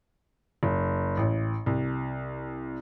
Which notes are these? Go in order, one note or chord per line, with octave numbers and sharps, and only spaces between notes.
F#1
A1
C2